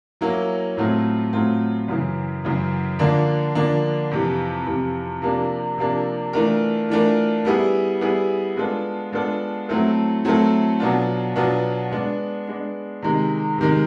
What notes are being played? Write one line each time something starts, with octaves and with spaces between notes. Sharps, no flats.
F#3 A#3 C#4 E4
A2 F#3 A3 C4 F4
A2 F#3 A3 C4 F4
F#2 C#3 E3
F#2 C#3 E3
D3 F3 A#3 D4
D3 F3 A#3 D4
F2 C3 E3
F2 C3 E3
C3 F3 A#3 D4
C3 F3 A#3 D4
E3 A3 D4 F4 A#4
E3 A3 D4 F4 A#4
G3 B3 E4 G#4
G3 B3 E4 G#4
G#3 B3 D4 F4 A4
G#3 B3 D4 F4 A4
F#3 A3 C4 E4 A4
F#3 A3 C4 E4 A4
B2 F#3 B3 D4 F4
B2 F#3 B3 D4 F4
G#3 B3 D4
G#3 B3 D4
C3 D#3 G#3
C3 D#3 G#3